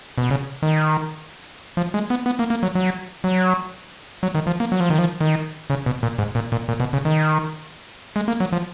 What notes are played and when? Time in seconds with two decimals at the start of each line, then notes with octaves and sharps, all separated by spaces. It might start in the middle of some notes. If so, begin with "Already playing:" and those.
0.18 B2
0.30 C#3
0.63 D#3
1.77 F3
1.94 G#3
2.10 B3
2.26 B3
2.39 A#3
2.50 A#3
2.63 F#3
2.75 F#3
3.24 F#3
4.23 F#3
4.35 D#3
4.47 F3
4.60 A#3
4.72 F#3
4.80 F3
4.90 D#3
4.98 F3
5.21 D#3
5.70 C#3
5.86 B2
6.03 A#2
6.18 G#2
6.35 A#2
6.52 A#2
6.68 A#2
6.80 B2
6.93 C#3
7.05 D#3
8.16 G#3
8.28 A#3
8.40 F#3
8.52 F3